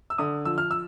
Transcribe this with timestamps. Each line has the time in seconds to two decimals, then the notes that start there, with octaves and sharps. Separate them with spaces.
0.10 E6
0.18 D3 D#6
0.45 F3 E6
0.58 F6
0.71 E6